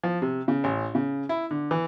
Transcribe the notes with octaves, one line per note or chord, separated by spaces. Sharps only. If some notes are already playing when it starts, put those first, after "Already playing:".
F3
C3
C#3
A1
C#3
E4
D3
E3